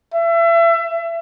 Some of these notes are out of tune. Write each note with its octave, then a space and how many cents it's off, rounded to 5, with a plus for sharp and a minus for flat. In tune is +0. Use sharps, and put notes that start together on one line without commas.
E5 +30